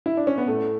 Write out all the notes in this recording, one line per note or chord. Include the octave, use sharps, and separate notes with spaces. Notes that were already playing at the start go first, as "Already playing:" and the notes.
E4
D4
C#4
B3
A2 A3